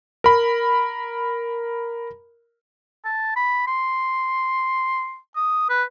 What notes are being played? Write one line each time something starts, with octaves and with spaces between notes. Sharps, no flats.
A#4 B5
A5
B5
C6
D#6
B4